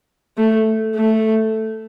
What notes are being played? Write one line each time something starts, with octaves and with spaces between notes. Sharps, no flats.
A3
A3